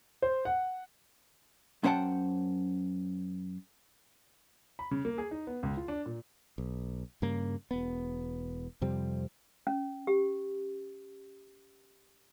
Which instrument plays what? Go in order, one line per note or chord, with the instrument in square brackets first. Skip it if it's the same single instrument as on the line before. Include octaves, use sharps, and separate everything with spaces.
[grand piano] C5
F#5
[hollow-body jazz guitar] F#2 C#4 C5 F#5 G5 A5
[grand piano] B5
C#3
A#3
G#4
D#4
B3
C#2
F4
D4
A#2
[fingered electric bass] B1
G2 C#3 A#3
E1 B3
F2 C3 G3 C4
[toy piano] C#4
G4